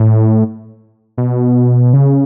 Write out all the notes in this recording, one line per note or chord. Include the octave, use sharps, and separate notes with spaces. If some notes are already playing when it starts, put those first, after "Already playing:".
Already playing: A2
B2
C#3